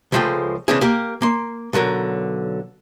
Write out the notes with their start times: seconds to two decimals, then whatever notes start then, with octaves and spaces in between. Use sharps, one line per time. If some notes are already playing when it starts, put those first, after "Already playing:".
0.12 C#2 A#2 F3 G#3 A3 G5
0.68 C#3 E3 G#3 C4 D4 G#4
0.81 A#3 G4 A#4
1.22 A#3 C6
1.73 B1 D3 F#3 A#4